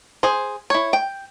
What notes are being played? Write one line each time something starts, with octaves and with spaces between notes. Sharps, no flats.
G#4 C5
E4 C#5
G5